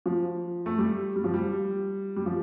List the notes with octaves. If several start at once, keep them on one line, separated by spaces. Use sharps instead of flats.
F3
A3
G3
G3
F3
G3
G3
F3